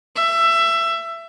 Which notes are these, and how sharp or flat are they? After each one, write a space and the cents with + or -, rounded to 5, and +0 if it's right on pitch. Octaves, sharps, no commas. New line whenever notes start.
E5 +20